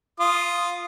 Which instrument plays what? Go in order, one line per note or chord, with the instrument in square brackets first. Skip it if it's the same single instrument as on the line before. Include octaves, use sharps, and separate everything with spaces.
[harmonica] F4 D#6